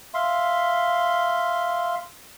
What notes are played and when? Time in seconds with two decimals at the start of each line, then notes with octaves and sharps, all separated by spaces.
0.14 E5 F5 C6